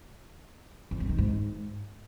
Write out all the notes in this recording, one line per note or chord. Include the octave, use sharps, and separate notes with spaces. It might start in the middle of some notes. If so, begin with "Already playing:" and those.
F2
G2
D#3
G#2